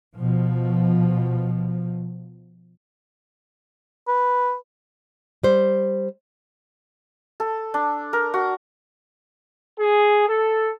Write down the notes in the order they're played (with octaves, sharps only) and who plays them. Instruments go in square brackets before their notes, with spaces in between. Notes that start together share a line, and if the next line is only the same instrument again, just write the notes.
[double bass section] B2 F3
[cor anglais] B4
[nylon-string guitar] G3 C5
[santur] A4
D4
A#4
F#4
[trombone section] G#4
A4